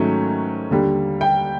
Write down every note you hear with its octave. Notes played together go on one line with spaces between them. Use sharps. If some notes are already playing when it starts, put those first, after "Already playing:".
Already playing: G#2 D#3 F#3 A3 C#4
D#2 D3 G3
G5